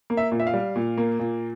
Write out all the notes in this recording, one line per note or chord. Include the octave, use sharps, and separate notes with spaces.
A#3
E5
A#2
E5
F5
G3
A#2
A#3
A#2